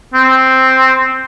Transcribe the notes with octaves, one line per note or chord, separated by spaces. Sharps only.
C4